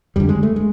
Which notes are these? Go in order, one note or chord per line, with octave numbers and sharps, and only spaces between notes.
F2 D3 G3
G#3
A3
G#3